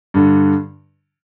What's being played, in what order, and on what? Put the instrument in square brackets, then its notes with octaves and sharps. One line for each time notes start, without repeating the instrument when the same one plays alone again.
[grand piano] G2 D3